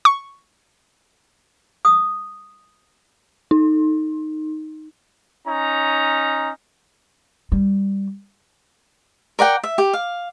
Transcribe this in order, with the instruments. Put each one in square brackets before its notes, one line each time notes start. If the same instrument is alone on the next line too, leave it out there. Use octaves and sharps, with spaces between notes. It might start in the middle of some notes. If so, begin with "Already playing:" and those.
[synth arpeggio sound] C#6
[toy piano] D#6
[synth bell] D#4
[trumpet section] C#4 D#4 A#5
[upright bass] G3
[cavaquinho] A#4 D5 F#5 G5
E5
G4
F5